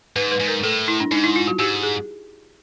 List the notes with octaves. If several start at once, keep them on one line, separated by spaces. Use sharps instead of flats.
G#2 B4
B4
G#2
A#4
A2 A4
E4
D4
G#2 D#4
E4
F4
F#4
G#2 G4
G#4